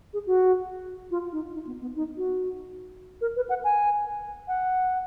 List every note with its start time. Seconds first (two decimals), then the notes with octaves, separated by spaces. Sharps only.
0.13 G#4
0.27 F#4
1.11 F4
1.32 D#4
1.54 D#4
1.67 B3
1.81 B3
1.96 D#4
2.17 F#4
3.21 A#4
3.36 B4
3.49 F#5
3.64 G#5
4.48 F#5